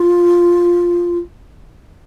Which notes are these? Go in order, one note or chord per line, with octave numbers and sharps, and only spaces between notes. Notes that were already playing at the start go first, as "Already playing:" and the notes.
Already playing: F4